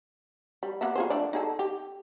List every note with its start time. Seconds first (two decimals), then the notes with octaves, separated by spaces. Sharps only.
0.63 G3
0.81 A#3 B3 E5
0.96 F4 G#4 C5
1.10 A3 D4 D5
1.33 D#4 G#4 A4
1.59 G4